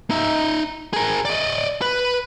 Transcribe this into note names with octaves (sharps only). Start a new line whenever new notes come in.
D#4 E5
G#4 A#4
D5 D#5
B4